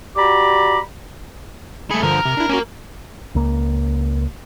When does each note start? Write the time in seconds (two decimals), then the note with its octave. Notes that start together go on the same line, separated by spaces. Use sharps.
0.17 F#4 G4 D5 A#5 B5 D6
1.91 A3 G#4 B5 C#7
2.03 G2 D3 F3 A#4
2.26 C3
2.37 D4 E4
2.50 A#3 C#4 F#4 A#4
3.35 C#2 A#3